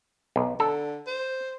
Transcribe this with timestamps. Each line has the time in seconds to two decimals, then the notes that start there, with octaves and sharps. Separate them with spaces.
0.36 B1
0.60 D3 A4
1.07 C5